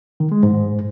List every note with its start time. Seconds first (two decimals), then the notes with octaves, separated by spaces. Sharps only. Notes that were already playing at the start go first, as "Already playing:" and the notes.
0.20 D#3
0.32 G#3
0.43 G#2